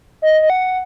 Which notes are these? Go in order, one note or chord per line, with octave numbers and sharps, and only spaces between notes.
D#5
D#5
F#5